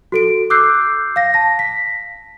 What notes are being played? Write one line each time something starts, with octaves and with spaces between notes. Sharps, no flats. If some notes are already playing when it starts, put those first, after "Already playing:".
F#4 A4 D7
D6 E6 F#6 G6 C7
F5 A#6
A5 A#6
B6